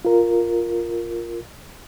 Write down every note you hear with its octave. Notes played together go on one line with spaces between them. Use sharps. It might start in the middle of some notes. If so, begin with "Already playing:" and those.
F4 A#4